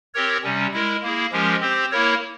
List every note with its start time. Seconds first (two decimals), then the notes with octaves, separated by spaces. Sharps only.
0.14 C4 G4 A#4 C#5
0.43 C3 G3 C#4
0.73 G#3 E4 A#4
1.03 A#3 E4 G#4
1.32 F3 G#3 C#4 G4 A#4
1.61 C4 G4 C5
1.91 A#3 E4 A#4 C#5